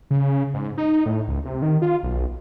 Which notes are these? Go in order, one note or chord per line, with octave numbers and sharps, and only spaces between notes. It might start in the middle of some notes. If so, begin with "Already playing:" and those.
C#3
G#2
D#4
A2
C#2
C3
D#3
F4
B1